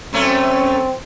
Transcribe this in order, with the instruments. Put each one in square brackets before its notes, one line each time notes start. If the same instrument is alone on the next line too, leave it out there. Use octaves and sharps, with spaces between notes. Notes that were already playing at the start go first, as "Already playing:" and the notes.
[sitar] F#2 A3 C#4 [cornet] C4